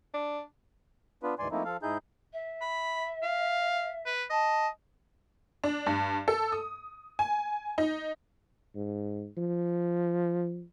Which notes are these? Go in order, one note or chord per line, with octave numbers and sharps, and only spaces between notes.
D4
B3 D4 F4 B4
D2 G#2 E3 D5 G#5 C6
F3 A3 A#3 C4 D#4 E4
F3 A4 F5
G#2 D#4 E4 G#4 G6
E5
B5
F5
B4
D#5 A5
D4
G2
A4
D#6
G#5
D#4
G#2
F3